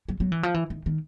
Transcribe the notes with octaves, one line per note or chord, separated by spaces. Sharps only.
F#3
F#3
E3
F3
E3
D#3
D#3